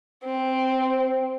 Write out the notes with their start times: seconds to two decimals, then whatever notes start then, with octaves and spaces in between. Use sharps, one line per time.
0.24 C4